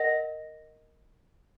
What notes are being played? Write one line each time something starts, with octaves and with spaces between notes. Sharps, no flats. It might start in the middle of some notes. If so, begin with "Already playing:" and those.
Already playing: A#4 D#5 F#5 A#6